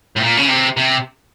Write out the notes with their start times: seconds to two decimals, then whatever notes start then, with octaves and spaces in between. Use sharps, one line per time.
0.16 A2
0.21 A#2
0.37 C#3
0.48 C3
0.77 C3